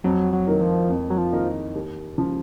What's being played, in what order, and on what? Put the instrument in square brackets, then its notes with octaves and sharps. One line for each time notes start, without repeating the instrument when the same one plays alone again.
[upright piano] F2 [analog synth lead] F#3
[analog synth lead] F#3
[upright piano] D#3 A#3 D#4 A#4
[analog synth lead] F3
[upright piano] F2
[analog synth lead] F#3
F3
[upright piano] D#3 A#3 D#4 A#4
D#2
C#3 F3